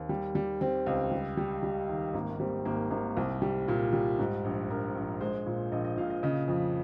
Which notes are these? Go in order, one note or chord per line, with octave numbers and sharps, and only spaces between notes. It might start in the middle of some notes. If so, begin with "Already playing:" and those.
Already playing: D#2 C4
G3
G3
G3 C4
C#2 C4
G3
G3
G3
D#3
G#1 A#3
A#3
G3 C4
G#1 A#3
G#1 A#3
C2 C4
G3
A#2
G3
G#2
A#1
A#1 A#4
A#1
G#3 C5
A#2
A#1 D#5
D#5
A#2 F5
D#5
C#3 D#5
F2